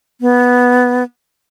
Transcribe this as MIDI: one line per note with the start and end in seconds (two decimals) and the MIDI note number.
0.21 1.03 59